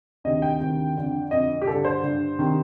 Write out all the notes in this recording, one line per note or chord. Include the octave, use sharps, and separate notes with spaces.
D2 C3 D#3 D#5
G5
D2 C3 D#3
F2 D3
F2 D3 D#5
G4
G2 D3 A4
C5
G2 D3
C3 D#3